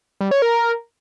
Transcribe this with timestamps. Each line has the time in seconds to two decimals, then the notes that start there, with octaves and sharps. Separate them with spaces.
0.21 G3
0.31 C#5
0.42 A#4